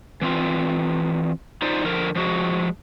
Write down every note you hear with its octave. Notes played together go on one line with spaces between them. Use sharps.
E3 C4 F4
D#4 F4 C5 D5
D3 F3 A#4
F3 G#3 F#4